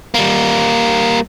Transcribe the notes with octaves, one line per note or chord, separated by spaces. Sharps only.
G3 A#3